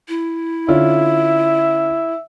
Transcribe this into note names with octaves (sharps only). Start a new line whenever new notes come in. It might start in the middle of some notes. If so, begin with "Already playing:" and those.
E4
D3 C#4 F4 E5